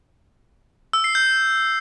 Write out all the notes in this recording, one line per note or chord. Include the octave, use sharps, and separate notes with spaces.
E6
C7
G6